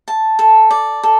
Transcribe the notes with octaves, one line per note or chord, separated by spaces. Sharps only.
A5
A4
D5
A4